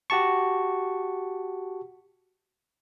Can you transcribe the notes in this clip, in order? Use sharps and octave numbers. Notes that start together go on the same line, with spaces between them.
F#4 G4 A5 C#6